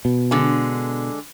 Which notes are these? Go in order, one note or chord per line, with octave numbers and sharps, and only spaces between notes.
B2
D3 G#3